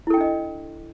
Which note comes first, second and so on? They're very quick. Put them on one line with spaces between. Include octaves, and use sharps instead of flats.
E4 A4 G5 D4 D#5